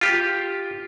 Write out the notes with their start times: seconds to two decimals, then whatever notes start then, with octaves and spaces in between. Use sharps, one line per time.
0.01 F4 G4